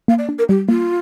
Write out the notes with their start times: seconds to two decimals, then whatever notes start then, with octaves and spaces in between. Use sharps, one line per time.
0.08 A#3 F5
0.18 D5
0.29 D4
0.38 A#4
0.49 G3 G4
0.69 A#3 F4